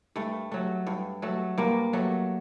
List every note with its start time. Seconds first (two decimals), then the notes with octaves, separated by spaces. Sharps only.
0.16 G2 A3
0.52 F#3 A3
0.87 G2
1.22 F#3 A3
1.58 G2 A#3
1.93 F#3 A3